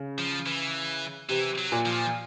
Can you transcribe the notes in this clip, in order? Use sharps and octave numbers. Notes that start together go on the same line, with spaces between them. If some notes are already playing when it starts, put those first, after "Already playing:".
Already playing: C#3
F3
E3
C3 E3
F#3
A#2
F3